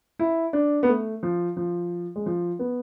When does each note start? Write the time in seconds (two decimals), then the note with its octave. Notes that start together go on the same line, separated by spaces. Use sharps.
0.19 E4
0.53 D4
0.83 B3
0.88 A3
1.23 F3
1.57 F3
2.16 G#3
2.26 F3
2.59 B3